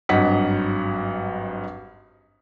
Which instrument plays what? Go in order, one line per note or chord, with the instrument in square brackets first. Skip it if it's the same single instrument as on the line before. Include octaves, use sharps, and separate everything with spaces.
[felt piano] G#1 G2 F#3 D#5 F#5 B6